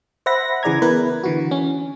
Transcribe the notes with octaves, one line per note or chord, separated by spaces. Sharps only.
C5 E5 F#5 B5 A#6
C#3 E3 G#4 D5 A#5 G#6
B3 E4 A#4 B4
D3 E3 F#4
C#4